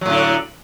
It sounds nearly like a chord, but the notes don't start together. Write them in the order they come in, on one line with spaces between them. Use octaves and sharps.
F#3 A2 D3